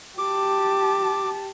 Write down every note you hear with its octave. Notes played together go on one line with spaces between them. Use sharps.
G4 A5 D6